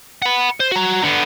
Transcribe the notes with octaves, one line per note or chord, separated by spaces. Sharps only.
F#5 B5
C5
F#4 A#5
D3 B3